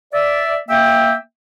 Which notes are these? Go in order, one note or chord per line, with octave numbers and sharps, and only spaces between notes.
D5 E5
A#3 E5 G5